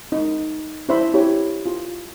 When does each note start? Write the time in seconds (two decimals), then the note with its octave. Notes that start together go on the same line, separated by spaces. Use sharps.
0.12 D#4
0.89 D4 E4 C5 E5 B5 C6
1.14 E4 G4 C#5
1.66 F4